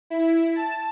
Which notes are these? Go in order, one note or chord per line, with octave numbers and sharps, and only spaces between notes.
E4
A5